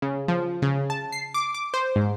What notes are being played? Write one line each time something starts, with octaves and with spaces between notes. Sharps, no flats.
C#3
F3
C#3
A5
C7
D6
D6
C5
G#2